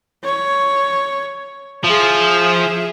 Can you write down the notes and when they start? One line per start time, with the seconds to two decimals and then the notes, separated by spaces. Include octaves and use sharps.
0.24 C#5
1.84 F3 G#4 E5